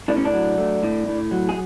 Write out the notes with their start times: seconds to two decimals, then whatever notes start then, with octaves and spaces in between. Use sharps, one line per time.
0.08 A2 D4
0.16 C#4
0.25 D4
0.33 F#3
0.58 A3
0.83 A2
1.07 A2
1.31 F#3
1.49 G#4